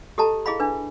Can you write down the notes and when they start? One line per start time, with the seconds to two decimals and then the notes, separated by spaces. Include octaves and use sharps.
0.18 G4 A4 D#5 A5 A#5
0.46 E4 G#4 D#5 F5 B5
0.60 D4 B4